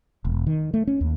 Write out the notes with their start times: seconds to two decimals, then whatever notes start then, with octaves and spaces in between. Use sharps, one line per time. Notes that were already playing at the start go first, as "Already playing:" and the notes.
0.25 E1
0.47 D#3
0.74 A3
0.87 C#4
1.01 D#2